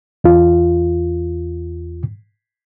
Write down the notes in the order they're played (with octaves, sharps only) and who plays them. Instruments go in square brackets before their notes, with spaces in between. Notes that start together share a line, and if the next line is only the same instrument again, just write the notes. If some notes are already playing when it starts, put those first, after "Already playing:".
[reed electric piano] E2 F4